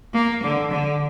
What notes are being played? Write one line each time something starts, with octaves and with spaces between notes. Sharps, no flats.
A#3
D3
D3